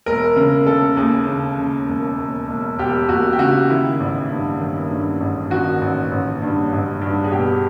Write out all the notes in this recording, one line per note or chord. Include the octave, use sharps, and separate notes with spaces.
E1 A#4
C#3 A#4
C#3 A4
D#2 G#4
C#3
C#3
E1
E1
E1
E1 G4
E1 F#4
G4
C#3 F#4
D#3 E4
A1
G2
D#3
G2
A1
D#3 F#4
A1
A1
G2
A1
G2
G#4
B2 G4